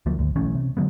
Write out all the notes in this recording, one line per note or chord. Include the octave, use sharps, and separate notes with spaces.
D2 F3 F#3 A#3
G#1 D2
B1 E3 A3 C#4
C3
D3 F#3 G#3 B3